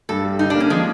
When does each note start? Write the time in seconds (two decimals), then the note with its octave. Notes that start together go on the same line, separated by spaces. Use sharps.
0.09 G2 A4
0.24 G3
0.39 D3 D#4
0.50 D4
0.55 A#3
0.60 C#4
0.70 F3 G#3